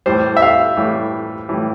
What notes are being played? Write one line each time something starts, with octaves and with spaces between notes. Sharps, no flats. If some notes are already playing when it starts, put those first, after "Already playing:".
A2 E3 G3 C5
E5
F5
A2 E3 G3
A2 E3 G3